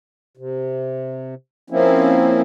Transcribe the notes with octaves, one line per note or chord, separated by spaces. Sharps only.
C3
F3 A#3 C4 C#4 E4